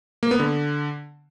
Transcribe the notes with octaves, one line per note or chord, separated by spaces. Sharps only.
A#3
B3
D3